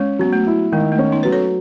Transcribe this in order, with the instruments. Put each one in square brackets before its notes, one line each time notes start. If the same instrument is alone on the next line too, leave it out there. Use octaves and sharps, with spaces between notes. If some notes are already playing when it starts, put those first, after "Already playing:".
Already playing: [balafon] G#3 [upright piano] C#4
[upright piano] F#3 [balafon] B3
[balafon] A3
[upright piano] E4
[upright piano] D#3 [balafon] G#3
[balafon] A3
[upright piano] C#4
[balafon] B3 D#4
[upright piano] F#3 [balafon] B4
[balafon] A4 C#5